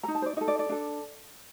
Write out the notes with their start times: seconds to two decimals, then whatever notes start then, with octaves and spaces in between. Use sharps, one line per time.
0.03 A4 A#5
0.08 D#4
0.15 A5
0.22 C5
0.26 D5
0.37 D#4 D#5
0.41 A4
0.48 D5
0.59 D5
0.69 D4 A4